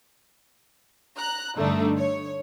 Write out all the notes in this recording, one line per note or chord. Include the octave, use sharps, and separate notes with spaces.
A#5 F#6
G2 D3 A3 D4 D#4
C#5